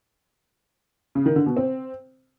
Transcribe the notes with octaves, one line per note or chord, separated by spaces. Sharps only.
C#3
D#3
D3
B2
C4